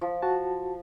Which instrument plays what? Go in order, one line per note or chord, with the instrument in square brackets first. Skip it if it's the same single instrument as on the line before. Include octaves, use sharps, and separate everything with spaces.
[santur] F3
[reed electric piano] F#4 A5